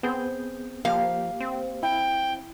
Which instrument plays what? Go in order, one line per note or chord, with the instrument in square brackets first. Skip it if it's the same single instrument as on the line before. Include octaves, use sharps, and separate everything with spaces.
[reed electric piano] B3 G#4 G6 [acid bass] C4
[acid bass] F3 [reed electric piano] A#3 G4 [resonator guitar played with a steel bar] F5
[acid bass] C4
[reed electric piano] E4 [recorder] G5